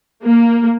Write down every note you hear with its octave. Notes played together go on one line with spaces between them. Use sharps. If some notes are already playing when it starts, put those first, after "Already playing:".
A#3